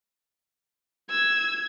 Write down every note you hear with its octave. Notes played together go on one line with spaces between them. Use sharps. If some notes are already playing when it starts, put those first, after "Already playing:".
E6 G#6